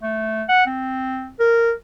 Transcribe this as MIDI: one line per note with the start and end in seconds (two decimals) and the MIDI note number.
0.02 0.43 57
0.48 0.65 78
0.66 1.30 60
1.39 1.72 70